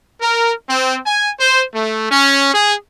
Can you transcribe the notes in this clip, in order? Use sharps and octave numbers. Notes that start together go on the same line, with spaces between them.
A#4
C4
G#5
C5
A3
C#4
G#4